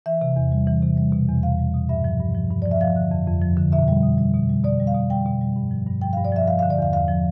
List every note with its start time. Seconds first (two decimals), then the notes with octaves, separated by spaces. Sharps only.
0.06 E3 E5
0.21 C3
0.36 E2
0.52 G3
0.67 E3
0.82 C3
0.97 G3
1.12 B2
1.28 E2
1.43 E2 F5
1.59 G3
1.74 B2
1.89 G2 E5
2.04 F3
2.20 G2
2.35 F3
2.51 G2
2.62 F3 D5
2.71 E5
2.81 F3 F5
2.96 D3
3.11 F2
3.27 F2
3.42 F3
3.57 D3
3.72 B2 E5
3.88 G3
4.03 B2
4.18 G3
4.34 B2
4.49 G3
4.64 B2 D5
4.80 G3
4.87 F5
4.94 B2
5.10 G3 G5
5.26 B2
5.41 G3
5.56 G2
5.71 F3
5.86 G2
6.01 F3 G5
6.13 G2 F5
6.25 D5
6.32 F3 E5
6.47 F3 F5
6.59 D3 F5
6.70 D5
6.78 E2 F5
6.93 E2 F5
7.08 F3